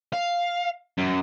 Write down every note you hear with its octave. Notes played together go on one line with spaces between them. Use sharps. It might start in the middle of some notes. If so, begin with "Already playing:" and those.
F5
F#2